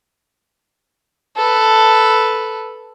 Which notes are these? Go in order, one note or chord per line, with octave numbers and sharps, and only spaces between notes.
A4 B4